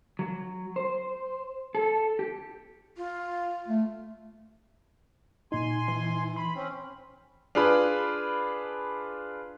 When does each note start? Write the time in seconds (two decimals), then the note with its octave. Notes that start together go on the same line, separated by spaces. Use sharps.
0.19 F#3
0.76 C5
1.75 A4
2.19 G4
2.97 F4
3.68 A3
5.52 A#2 D#4 G#5 C6
5.88 E3
6.36 B5 C6
6.56 C4 C#4
7.55 D4 F4 G#4 B4 B5